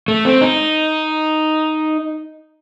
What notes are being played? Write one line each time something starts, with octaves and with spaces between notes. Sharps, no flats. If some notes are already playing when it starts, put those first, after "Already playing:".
A3
C4
D#4